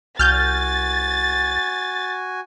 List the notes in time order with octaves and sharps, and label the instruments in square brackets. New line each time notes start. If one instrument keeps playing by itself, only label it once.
[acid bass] C2 [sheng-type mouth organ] F#4 G#5 [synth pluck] F6 G6 [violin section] A6